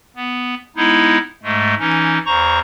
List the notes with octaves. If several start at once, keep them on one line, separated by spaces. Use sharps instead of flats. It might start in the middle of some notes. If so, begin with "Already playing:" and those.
B3
G#3 B3 D#4 E4
G#2 G#3 A3
E3 C#4 D#4
E2 C5 A#5 C#6